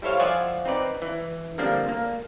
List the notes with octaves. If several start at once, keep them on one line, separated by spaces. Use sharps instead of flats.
G3 E4 A4 C5 C#5 F5
F3 F4 D5 E5 F#5 G#5
C4 D#4 B4 D5
E3
D3 F3 G3 A#3 C4 D4
A#3